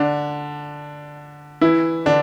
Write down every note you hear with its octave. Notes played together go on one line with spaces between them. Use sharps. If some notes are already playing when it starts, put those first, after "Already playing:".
Already playing: D3 D4
E3 E4
D3 D4